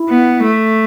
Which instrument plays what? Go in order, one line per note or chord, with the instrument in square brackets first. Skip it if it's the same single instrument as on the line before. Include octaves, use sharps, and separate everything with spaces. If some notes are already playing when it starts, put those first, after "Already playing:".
Already playing: [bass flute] E4
[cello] B3
A3